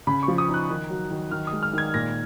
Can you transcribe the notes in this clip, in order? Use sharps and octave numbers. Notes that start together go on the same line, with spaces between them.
C#3 B5
C#6
F3
D#6
D#4 F#6
D#3
F#3
D#3
D#3 F6
D#6
G#3
F6
D#3 G#6
A#2 A#6